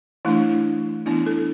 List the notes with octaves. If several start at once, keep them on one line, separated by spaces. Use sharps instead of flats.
E3 A3 D4 E4
E3 B3 D4 E4
A4